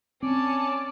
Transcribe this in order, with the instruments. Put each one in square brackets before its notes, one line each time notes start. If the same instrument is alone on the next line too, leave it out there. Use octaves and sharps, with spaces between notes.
[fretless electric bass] C4 [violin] C#4 A5 [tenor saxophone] D5